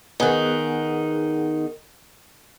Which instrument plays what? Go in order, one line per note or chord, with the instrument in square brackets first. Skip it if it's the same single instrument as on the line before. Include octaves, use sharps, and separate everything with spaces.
[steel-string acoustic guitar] D#3 D#4 [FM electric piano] B3 G#4 F#5